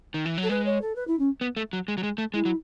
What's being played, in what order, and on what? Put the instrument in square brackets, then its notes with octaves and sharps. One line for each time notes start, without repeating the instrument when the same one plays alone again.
[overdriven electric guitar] D#3
E3
[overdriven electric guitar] F#3 [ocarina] A4
[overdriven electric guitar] G#3 [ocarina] B4
[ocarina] C#5
A4
B4
E4
C#4
[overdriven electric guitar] B3
A3
F#3
G#3
F#3
G#3
A3
[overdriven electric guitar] G#3 [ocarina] E4
[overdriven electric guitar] F#3